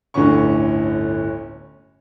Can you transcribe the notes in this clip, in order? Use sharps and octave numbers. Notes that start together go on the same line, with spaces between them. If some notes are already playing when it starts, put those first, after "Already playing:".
G1 D2 A2 D3 C#4 C#6